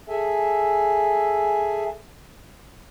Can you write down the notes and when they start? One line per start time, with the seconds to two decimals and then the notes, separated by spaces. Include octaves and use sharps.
0.09 G#4 A4 E5 G#5